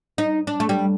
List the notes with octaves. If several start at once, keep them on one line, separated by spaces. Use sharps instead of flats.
D#4
D4
A3
G3